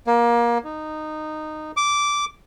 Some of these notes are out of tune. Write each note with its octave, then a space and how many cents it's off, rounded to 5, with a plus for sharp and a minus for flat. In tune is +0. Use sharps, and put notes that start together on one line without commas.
A#3 +25
D#4 -15
D6 -10